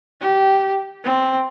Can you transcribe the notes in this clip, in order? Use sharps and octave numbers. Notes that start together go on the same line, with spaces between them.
G4
C4